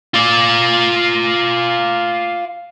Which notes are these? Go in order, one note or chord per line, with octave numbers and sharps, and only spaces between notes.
F4 D5